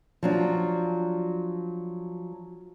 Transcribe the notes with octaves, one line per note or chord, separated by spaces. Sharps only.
F3 F#3 D4